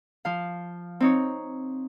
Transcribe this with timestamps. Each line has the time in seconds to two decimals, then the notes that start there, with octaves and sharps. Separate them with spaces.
0.25 F3 F5
1.00 C4 D#4 C#5